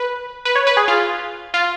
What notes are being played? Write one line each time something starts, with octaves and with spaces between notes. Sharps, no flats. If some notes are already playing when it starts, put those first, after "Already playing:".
Already playing: B4
B4
C#5
B4
G#4
F4
F4